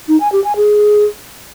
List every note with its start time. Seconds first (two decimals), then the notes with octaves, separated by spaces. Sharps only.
0.08 D#4
0.20 G#5
0.32 G4
0.44 G#5
0.56 G#4